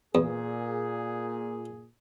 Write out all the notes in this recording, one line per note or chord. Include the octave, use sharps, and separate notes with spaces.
E2 A#2 G#4